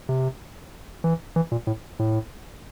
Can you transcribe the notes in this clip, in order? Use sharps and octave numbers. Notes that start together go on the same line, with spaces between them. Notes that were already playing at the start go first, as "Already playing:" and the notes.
C3
E3
E3
A#2
A2
A2